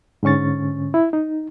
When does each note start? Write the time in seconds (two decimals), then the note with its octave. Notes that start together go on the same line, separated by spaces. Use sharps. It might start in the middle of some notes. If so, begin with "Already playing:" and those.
0.23 G#2 D3 C#4 C#6 A6
0.94 E4
1.13 D#4